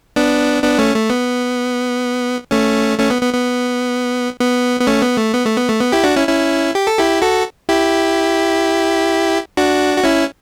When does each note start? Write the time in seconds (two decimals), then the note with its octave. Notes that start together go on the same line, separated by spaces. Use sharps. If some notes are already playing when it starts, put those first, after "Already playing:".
0.16 B3 D4
0.63 B3 D4
0.79 A3 C#4
0.95 A3
1.10 B3
2.51 A3 C#4
2.99 A3 C#4
3.10 B3
3.22 B3
3.34 B3
4.40 B3
4.80 B3
4.87 A3 C#4
5.02 B3
5.18 A3
5.33 B3
5.46 A3
5.58 B3
5.69 A3
5.81 B3
5.92 E4 G4
6.04 D4 F#4
6.16 C#4 E4
6.28 C#4 E4
6.75 G4
6.87 A4
6.99 E4 G4
7.22 F#4 A4
7.69 E4 G4
9.57 D4 F#4
9.97 F#4
10.04 C#4 E4